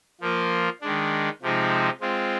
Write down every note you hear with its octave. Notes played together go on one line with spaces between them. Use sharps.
F3 A#3 F4
D#3 G#3 D4
C3 F3 G#3 C4 D#4
G#3 C4 F4